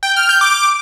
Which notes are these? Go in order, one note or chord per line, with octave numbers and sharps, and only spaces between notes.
G5
F6
G6
D6